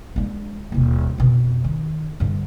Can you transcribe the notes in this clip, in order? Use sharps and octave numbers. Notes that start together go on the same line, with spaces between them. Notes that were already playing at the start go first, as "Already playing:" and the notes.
G#3 D4
D#1 B2
F2 B2
D#3
G2 D3